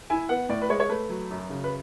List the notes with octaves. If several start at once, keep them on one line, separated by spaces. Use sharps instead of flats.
E4 G#5
B3 F#5
A2 D5
B4
G#3 C#5
C#5
A3 B4
F#3
F#2
C#3
B4